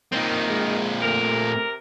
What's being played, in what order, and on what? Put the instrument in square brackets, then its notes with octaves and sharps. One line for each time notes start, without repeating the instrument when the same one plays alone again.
[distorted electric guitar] A#2 C4 [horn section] D#3
[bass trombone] G#3
[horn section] C3 A#4 [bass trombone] A3